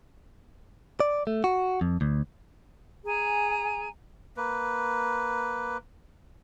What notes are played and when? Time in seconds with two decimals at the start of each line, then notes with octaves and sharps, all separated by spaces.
1.00 D5
1.27 A3
1.44 F#4
1.81 F2
2.01 D2
3.05 G#4 G#5 A#5
4.37 A#3 B4